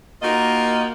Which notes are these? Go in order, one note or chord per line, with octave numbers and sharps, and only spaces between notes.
A#3 D#4 F4 F#4 A#4 D#5